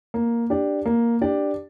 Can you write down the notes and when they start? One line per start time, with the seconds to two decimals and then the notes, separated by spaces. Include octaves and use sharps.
0.14 A#3
0.50 D4 G4 D5
0.86 A#3
1.21 D4 G4 D5